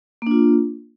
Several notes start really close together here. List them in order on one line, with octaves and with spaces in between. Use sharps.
A#3 D4 F4